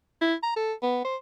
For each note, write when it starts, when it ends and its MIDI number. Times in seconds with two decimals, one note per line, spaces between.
0.22 0.35 64
0.43 0.53 82
0.56 0.74 69
0.83 1.02 59
1.05 1.16 72